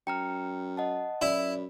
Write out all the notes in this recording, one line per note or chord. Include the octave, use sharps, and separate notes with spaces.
F#2 G5 A#5 F6 C#7
D#5 F#5 A5
F#2 E4 F#4 D5 B5